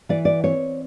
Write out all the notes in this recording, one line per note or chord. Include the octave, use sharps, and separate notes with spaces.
E3 D5
D5
C4 C#5